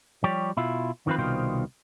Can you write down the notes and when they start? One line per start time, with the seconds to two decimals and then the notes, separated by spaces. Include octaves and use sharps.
0.24 F3 G3 G4 C#5
0.57 B2 E4 F4
1.07 D#3 F3 C4 F4 B4
1.18 C2 B2 D#3 C4 F4 C5